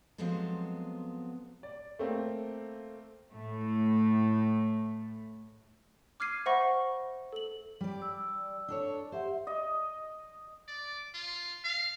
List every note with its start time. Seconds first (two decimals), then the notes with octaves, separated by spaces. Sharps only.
0.18 F3 F#3 G#3 B3 C4 A4
1.63 D5
1.99 A3 A#3 C4
3.33 A2 A3
6.20 D6 F6 G#6 C7 D#7
6.46 C5 E5 F#5 B5 C#6 A#6
7.33 A4 F#7
7.81 G3 D5
8.02 E6
8.68 D4 A4 C#5
9.12 G4 C5 E5 F#5
9.47 D#5
10.68 D5
11.14 F4
11.64 F5